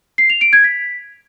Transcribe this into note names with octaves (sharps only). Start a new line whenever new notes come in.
C7
F7
D7
G#6
B6